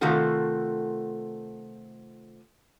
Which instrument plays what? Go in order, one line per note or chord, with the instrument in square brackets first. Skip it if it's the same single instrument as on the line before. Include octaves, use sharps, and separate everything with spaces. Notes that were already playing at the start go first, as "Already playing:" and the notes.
[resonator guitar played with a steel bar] C3 D#3 A3 F4 F#4 A4